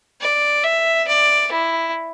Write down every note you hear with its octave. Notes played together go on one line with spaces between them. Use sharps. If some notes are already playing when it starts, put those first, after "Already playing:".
D5
E5
D5
E4